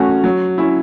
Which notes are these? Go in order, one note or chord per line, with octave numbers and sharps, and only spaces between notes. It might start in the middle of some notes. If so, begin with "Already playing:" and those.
Already playing: E3 A3 C#4 F#4
F#3
C#4 E4